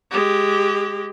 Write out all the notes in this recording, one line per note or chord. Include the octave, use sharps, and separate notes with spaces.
G#3 G4